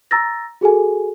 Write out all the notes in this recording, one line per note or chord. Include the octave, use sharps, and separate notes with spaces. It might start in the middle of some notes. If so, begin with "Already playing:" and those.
A#5 E6 A6 A#6
F#4 G#4 A4 G#5